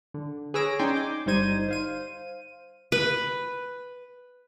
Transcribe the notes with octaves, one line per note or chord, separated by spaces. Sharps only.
D3
G#4 B4 C#5 E6 A#6 D7
C#4 D#4 D5 G5 G#5 C6
D6 G6
G1 G3 D#4 C5 G#6 D#7
C5 F5 D#7
B4